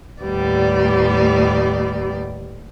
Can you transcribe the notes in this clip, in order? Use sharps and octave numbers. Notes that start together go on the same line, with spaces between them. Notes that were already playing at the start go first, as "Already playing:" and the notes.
D#2 A2 G3 B3 D5